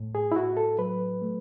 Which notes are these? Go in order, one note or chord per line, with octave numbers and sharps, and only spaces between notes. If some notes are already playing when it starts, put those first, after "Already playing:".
Already playing: A2
G#4
E4
A2 F#4
A4
F#3 B4
A3